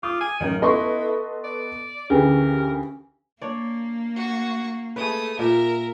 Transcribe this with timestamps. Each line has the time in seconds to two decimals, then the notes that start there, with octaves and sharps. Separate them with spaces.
0.03 F4 D6 D#6
0.21 G#5
0.40 A1 F#2 D#3 A#4
0.62 B3 E4 A4 B4 D#5 C6 C#6
1.44 D5
2.10 D2 C#3 E3 G4 A#4 G5
3.41 A#3 D4 C#5 D5
4.16 F#4 C#6
4.96 A3 G#4 B4 D#6
5.39 A#2 A#4 E5